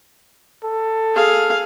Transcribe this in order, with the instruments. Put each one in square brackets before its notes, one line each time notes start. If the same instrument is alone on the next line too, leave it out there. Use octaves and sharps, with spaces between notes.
[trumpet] A4
[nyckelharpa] G#4 F5